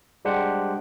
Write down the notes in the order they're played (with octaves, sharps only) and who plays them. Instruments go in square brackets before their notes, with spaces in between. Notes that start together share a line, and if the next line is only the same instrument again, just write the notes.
[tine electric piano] G3 G#3 D4 G4 C5 F#5